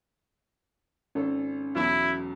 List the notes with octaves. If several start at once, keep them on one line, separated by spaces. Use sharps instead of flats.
G#1 C#4 A4
B1 E2 F#3 E4